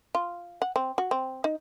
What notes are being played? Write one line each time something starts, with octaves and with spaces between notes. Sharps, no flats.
F4
F#5
C4
F#4
C4
D#4